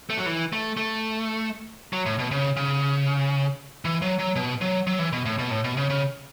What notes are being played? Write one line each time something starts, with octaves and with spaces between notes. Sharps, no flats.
A3
F#3
E3
A3
A3
F#3
A2
B2
C#3
C#3
E3
F#3
F#3
B2
F#3
F#3
E3
B2
A2
B2
A2
B2
C#3
C#3